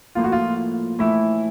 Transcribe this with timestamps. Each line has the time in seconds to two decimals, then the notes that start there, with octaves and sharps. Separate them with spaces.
0.15 A2 F3 A#3 F4
0.24 F#4
0.32 F4
0.99 A2 E3 A3 E4